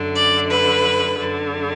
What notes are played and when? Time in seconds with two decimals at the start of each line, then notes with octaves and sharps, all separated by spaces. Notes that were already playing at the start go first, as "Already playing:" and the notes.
Already playing: F#2 D3
0.16 D5
0.51 B4
1.18 F#2 D3